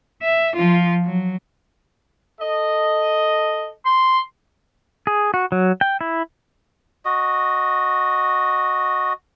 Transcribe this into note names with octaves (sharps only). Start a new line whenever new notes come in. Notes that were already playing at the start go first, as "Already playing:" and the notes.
E5
F3 F4
F#3
A4 D#5
C6
G#4
F#4
F#3
G5
E4
F#4 D#5